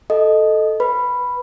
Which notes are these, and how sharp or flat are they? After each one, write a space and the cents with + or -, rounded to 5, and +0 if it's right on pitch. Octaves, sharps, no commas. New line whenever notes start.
A4 -5 D#5 +0
B4 +0 B5 +0